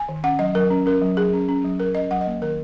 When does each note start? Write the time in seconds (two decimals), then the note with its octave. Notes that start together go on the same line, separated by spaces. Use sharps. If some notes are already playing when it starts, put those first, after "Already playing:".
Already playing: G#5
0.08 D#3
0.24 C#4 F#5
0.39 F#3 D#5
0.55 F#3 A#4
0.71 C#4
0.86 C#4 A#4
1.02 F#3
1.17 F#3 G#4
1.33 C#4
1.49 C#4
1.64 F#3
1.80 F#3 A#4
1.95 C#4 D#5
2.11 F#3 F#5
2.21 D#5
2.27 A#3
2.42 D#3 A#4